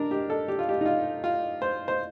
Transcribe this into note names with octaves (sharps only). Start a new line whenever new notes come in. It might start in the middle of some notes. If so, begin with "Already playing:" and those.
Already playing: D4 A#4
G4
A4
G4
F4
G4
D#4
F4
F4
C5
C5